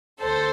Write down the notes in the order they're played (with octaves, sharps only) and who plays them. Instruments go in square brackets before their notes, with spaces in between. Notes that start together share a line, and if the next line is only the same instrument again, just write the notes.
[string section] D2 A4 C5